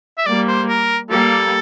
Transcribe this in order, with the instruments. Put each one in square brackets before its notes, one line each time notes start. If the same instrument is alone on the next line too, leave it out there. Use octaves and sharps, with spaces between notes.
[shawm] E5
[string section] G3 A#3 [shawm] D5
[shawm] C5
A#4
[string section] G3 A#3 [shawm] A4